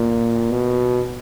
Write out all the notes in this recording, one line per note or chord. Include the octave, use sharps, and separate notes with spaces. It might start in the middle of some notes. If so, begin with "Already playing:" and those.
Already playing: A#2
B2